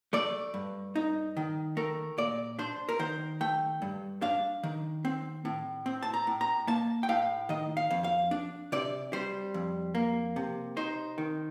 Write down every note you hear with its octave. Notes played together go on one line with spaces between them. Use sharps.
A3 D5
G2
D#4
D#3
A3 A#4
A#2 D5
D4 C5
A#4
D#3 C5
A3 G5
G2
D4 F5
D#3
C4
A2
C4
A5
A#5
A2
A#5
A#3 A5
G5
A2 F5
D#3 D#5
F5
F2
F5
D4
C3 D5
G3 C5
F2
A#3
C3
D#4 C5
D#3